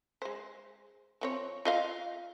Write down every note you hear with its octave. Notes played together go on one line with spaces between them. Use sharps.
G#3 C5
F3 C4 C#5
F4 D#5 F5